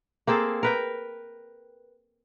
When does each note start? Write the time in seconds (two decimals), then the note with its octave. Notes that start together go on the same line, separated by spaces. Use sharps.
0.27 A#3 C4 G#4 A4
0.63 A#4 B4 G5